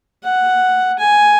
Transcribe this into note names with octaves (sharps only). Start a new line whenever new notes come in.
F#5
G#5